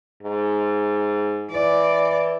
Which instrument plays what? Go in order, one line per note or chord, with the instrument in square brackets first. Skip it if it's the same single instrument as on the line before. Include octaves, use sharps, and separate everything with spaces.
[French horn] G#2
[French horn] E3 [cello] D5